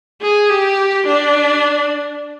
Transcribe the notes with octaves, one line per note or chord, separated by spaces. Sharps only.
G#4
G4
D4